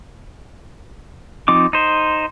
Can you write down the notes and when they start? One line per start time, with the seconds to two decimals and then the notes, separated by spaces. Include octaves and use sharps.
1.48 F3 C4 D#4 D6
1.73 D#4 C5